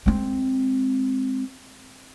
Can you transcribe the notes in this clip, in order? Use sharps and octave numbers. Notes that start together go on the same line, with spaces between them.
G#3 C4